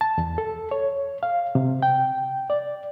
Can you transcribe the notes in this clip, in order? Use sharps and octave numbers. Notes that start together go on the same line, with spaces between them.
A5
E2
A4
C#5
F5
C3
G5
D5